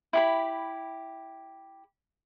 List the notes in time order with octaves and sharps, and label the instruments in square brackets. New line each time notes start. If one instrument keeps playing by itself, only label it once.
[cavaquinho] E4 G4 B5